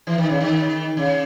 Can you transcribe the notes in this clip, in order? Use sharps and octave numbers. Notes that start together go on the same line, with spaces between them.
E3
D#3
C#3
D#3
C#3